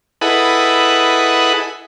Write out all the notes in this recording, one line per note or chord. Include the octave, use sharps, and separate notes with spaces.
E4 G#4 A4 B4 D#5 F#5